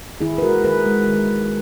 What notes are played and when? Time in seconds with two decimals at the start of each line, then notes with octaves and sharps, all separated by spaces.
0.21 D#3 E4 G#4
0.38 B4
0.42 G#3 F#4 A#4
0.64 D#3 G#4 B4
0.86 G#3
1.08 D#3
1.30 G#3